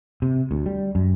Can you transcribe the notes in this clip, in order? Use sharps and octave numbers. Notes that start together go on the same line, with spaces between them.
C3
D2
G3
F#2